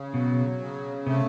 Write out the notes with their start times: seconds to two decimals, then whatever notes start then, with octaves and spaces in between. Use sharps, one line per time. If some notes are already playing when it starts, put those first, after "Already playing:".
Already playing: C#3
0.14 B2 F#3
0.61 C#3
1.07 C3 A3